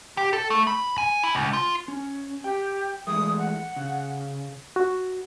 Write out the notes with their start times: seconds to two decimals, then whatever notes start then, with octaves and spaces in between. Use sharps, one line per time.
0.17 G4
0.33 A4
0.50 A3
0.67 B5
0.98 G#5
1.23 E4
1.35 C#2
1.53 F4
1.88 C#4
2.44 G4 G5
3.07 E3 G#3 A3 D#6
3.38 F#5
3.77 C#3
4.76 F#4